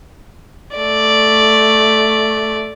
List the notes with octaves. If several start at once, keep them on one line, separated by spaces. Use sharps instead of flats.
A3 D5